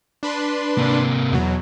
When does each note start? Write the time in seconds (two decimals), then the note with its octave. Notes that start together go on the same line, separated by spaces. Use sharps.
0.23 D4 B4 C6
0.78 C3 A#3
1.32 E2 B2 F#3